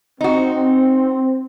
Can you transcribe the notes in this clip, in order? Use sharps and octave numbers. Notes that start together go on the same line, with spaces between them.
C4 D#4 F#4